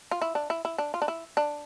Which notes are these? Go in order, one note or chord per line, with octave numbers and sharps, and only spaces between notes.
F4
E4
D4
E4
E4
D4
F4
D4
E4
D4